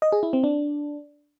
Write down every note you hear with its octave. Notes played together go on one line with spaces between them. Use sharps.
D#5
G#4
E4
C4
D4